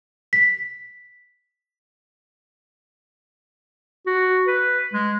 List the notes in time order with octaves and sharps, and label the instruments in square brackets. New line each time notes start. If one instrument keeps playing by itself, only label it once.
[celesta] B6
[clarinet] F#4
B4
G#3